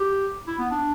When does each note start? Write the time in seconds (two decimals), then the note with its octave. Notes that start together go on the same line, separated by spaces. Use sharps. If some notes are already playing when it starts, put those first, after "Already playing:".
Already playing: G4
0.47 E4
0.59 B3
0.71 D4